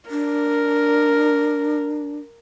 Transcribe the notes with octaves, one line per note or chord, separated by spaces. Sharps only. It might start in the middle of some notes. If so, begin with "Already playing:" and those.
D4 A#4